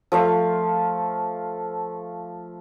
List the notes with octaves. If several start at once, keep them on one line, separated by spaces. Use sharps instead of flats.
F3 A3 F5